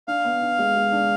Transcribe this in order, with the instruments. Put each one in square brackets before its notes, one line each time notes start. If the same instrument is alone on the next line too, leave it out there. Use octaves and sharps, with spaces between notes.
[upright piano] D4 [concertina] F5
[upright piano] B3
D4
G#3
G#3
D4